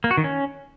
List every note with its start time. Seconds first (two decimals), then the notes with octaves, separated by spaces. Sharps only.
0.04 A#3
0.11 F#4
0.17 D#3
0.24 C#4